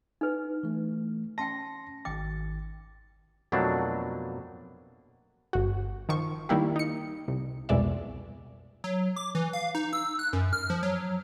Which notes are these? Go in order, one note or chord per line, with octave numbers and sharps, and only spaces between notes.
D#4 B4
E3 A3
C#4 G5 A5 C6 A#6
G#1 D#3 G5 D6 A6
F2 B2 F#3 A3 A#3 D4
G1 F#4
D#3 F3 C#6
D#3 G3 A#3 E4 G4
D#4 C#7
C2
C2 F2 B2 G#3 D5 E5
F#3
D6
E3
F5
D#4
E6
F#6
F#2
F6
F3
F#3